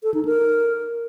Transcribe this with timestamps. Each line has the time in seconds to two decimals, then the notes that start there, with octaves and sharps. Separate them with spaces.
0.03 A4
0.14 D#4
0.25 A#4